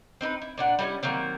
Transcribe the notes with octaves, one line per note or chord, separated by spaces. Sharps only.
C4 D#4 B4
E4
A#2 D4 F#5
G3 A3 C#4 E4
D#3 F#3 A#3 C4